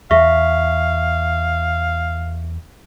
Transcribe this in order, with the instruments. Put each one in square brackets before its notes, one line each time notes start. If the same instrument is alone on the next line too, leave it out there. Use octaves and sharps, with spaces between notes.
[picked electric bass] E2 [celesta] E5 C#6 B6 [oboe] F5